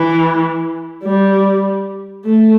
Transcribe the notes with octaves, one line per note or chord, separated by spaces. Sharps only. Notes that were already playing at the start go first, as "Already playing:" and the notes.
Already playing: E3
G3
A3